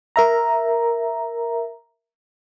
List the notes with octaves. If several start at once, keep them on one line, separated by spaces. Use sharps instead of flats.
A#4 E5 A#5